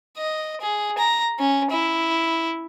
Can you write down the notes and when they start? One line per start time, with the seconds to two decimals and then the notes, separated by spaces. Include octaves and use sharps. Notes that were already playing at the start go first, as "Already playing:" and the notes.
0.17 D#5
0.61 G#4
0.98 A#5
1.39 C#4
1.71 E4